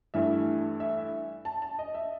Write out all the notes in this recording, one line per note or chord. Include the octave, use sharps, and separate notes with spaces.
G2 E3 A3 E5
E5
A5
A5
D#5
E5